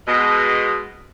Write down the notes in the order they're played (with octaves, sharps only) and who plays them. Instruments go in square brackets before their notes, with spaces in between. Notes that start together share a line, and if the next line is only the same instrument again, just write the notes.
[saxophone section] B2 G#3